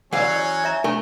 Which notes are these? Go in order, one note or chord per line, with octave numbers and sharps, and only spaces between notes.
E3 F#3 C#4 D5 F5 F#5 G#5
C#5
C#5 E5 A#5
A3 D4 A#4